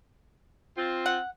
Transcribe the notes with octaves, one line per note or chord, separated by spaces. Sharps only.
C4 F4
F#5